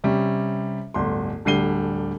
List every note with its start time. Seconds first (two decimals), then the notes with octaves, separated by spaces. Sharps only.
0.04 C3 G3 C#4
0.94 D1 G1 C6
1.45 D1 D3 G3 C7 D#7 G7